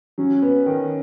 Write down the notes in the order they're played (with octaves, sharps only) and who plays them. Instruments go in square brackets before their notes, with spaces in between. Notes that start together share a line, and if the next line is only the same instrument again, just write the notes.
[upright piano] F#3 [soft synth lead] C#4
[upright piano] B3
D#3